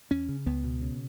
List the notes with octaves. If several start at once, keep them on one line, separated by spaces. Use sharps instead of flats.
E2 C#4
C#3
C#2 B3
B2
C#3